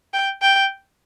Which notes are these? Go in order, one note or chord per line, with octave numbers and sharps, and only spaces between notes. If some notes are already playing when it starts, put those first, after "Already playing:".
G5
G5